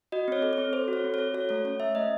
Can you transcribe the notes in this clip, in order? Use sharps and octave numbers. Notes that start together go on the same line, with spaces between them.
F#4 D#5
C4 C#5
A4
C#5
C4
A4 C5
F#4
C#5
C4
A4 C#5
F#4 C#5
A3 C#5
C#4 C#5
A3 E5
A3 D#5